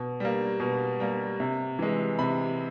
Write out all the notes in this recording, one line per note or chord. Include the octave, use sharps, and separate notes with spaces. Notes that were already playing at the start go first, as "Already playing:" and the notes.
Already playing: B2
G3 A#3
B2
G3 A#3
C3
E3 G#3
C3 B5